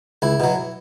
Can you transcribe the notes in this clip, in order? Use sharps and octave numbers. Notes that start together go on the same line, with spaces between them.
C#2 E4
B2 F#3